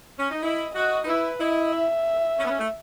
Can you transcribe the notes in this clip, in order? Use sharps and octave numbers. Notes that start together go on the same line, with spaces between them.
C#4
D#4
E4 D#5
F#4 D#5
D#4
E4 B4
E4 D#5
E5
C#4
B3
C#4
A3